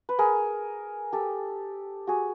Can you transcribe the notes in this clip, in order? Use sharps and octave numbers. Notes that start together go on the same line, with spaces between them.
B4
G#4 A#4
G4 A4
F#4 G#4